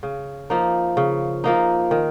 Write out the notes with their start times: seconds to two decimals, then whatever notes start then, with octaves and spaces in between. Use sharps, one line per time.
0.03 C#3
0.50 F3 A#3 D#4
0.97 C#3
1.44 F3 A#3 D#4
1.91 D#3